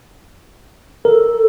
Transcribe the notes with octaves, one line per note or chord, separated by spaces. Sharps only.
A4 A#4